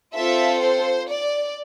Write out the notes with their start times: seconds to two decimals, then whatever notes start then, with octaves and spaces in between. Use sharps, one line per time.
0.15 C4 F4 A4 E5
0.61 C5
1.08 D5